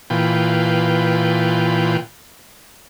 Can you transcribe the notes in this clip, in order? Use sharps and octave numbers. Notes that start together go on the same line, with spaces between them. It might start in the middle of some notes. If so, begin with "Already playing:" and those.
A#2 E3 F4 B4 G5